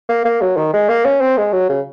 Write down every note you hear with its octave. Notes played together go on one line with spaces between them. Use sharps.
A#3
A#3
F#3
D#3
G#3
A#3
C#4
C4
G#3
F#3
C#3